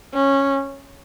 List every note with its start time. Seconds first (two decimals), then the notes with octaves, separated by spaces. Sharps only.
0.13 C#4